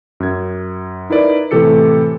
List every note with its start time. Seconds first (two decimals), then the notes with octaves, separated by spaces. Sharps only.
0.20 F#2 G#6
1.10 D#4 E4 A#4 B4 D5
1.51 A2 C3 E3 G4 A4 C#7